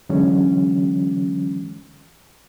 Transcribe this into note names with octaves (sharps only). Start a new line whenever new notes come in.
D3 E3 F#3 G#3 C#4